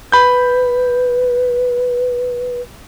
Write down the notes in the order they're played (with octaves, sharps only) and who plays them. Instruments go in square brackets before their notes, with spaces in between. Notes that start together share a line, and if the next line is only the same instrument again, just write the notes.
[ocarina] B4 [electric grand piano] B5 G6